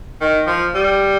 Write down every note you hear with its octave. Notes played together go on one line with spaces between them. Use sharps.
D#3
F3
G3